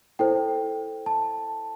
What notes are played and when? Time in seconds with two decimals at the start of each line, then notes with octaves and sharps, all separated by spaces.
0.19 E4 A4 C5 G5
1.06 A5